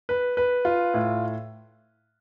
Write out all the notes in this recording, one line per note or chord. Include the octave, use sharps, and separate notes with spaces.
B4
B4
F4
A2